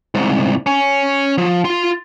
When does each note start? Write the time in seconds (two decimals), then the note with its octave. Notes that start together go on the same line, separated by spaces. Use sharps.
0.15 C2 G#2
0.66 C#4
1.38 F3
1.65 F4 C6